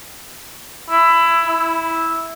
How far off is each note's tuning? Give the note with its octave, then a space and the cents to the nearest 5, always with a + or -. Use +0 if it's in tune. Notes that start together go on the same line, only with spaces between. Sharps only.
E4 +15
E4 -5